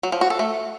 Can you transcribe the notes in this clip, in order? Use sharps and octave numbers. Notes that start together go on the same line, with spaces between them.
F#3
F3
F#4
A4
A3